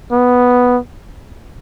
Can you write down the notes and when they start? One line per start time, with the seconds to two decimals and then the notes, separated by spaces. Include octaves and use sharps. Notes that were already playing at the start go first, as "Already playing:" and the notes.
0.12 B3